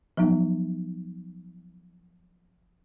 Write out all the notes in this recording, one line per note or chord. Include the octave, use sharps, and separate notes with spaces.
F3 F#3 B3 D#4